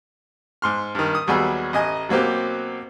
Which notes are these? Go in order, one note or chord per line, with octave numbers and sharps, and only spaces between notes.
G#2 C6 F6
G2 D#3
D#6
D#2 F#3 G3 B3 G#4 E6
A1 D#5 G#5
B2 F#3 A#3 C4 G4